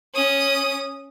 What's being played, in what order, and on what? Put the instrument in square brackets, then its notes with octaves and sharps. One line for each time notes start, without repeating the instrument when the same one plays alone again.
[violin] C#4 D#6